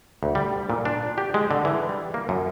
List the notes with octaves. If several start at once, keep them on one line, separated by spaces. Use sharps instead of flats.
D2
G3
A#2
D4
G4
G#3
D3
E3
G3
A#3
F#2